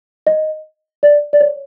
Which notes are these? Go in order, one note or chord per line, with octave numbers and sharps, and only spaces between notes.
D#5
D5
D5
C#5